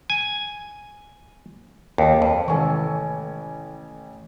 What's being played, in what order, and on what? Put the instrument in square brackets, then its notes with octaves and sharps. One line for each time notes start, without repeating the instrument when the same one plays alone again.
[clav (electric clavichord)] G#5
D#2
F2
[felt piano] A1 G#5 C#6 [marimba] C3 D#3 G#3 [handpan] E3 A4